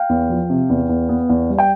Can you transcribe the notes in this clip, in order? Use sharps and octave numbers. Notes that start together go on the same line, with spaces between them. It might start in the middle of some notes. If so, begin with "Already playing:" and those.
Already playing: F5 G5
E2
F3
C3
E2
E2
B3
E2
G3
G5